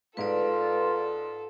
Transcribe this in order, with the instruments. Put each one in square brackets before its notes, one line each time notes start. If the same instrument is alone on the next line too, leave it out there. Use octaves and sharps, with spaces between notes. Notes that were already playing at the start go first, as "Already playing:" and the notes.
[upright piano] G#2 G#3 [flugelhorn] F4 [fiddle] A4 [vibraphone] B4 D5